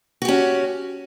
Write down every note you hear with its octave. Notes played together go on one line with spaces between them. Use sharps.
C#4 F#4 G4